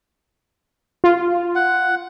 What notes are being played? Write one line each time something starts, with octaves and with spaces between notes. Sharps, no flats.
F4
F#5